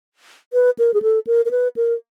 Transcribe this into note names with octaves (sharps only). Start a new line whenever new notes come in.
B4
A#4
G#4
A4
A#4
A#4
B4
A#4